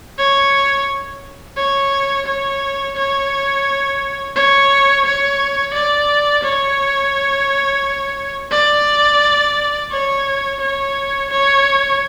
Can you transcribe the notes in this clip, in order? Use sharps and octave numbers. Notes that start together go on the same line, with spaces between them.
C#5
C#5
C#5
C#5
C#5
C#5
D5
C#5
D5
C#5
C#5
C#5